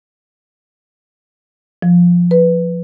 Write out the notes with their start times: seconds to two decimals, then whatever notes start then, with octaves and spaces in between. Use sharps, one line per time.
1.82 F3
2.31 B4